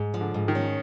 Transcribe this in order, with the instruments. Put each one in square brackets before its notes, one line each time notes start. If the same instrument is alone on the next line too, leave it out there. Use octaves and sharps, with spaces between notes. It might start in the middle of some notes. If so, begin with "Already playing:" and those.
Already playing: [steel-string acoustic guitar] G#2
F3
[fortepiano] D3
[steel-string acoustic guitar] G#2
[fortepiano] D#3
[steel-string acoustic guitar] C#4